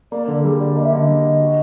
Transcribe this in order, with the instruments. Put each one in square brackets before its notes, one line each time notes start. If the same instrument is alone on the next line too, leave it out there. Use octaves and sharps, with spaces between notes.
[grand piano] A#3 [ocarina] D5
[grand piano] D3 [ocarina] A4
[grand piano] G3 [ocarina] G#4
[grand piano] D3 [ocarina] D5
[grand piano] A#3 [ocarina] D#5
[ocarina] E5
[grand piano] D3 [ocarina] D#5
[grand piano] G3
D3
F#4